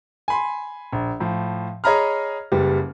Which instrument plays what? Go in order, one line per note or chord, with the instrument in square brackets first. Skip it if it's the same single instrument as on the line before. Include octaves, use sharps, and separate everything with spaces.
[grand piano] G#5 B5 C6
A#1
A2 F3
G#4 C#5 D#5 A#5 B5 F6
F#1 G3 G4 B4